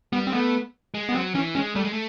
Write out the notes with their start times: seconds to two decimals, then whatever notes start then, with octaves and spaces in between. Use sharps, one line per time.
0.12 G3 B3
0.27 C4
0.32 A3 B3
0.94 G#3
1.09 B3
1.14 F#3 C4
1.34 E3 C#4
1.55 G#3 C#4
1.75 G3 A3
1.84 G#3
1.93 A3